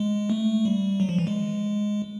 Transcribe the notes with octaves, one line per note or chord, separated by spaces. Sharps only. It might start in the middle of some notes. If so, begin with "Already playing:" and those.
Already playing: G#3
A3
G3
F#3
F3
E3
G#3